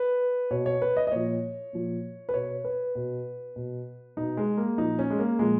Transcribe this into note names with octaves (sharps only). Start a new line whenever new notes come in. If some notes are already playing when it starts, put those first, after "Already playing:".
Already playing: B4
B2 C#5
C#5
B4
D#5
D#5
A#2 F3 C#5
A#2 F3
B4
B2 C#5
B4
B2
B2
B2 D#4
G#3
A#3
A#2 F3 D#4
C#4
G#3
A#3
A#2 F3 G#3